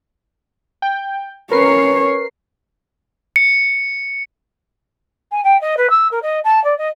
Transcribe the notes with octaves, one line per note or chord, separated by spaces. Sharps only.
G5
C#4 A#4 B4 C#5 C7
C#7
G#5
G5
D#5
B4
E6
A#4
D#5
A5
D5
D#5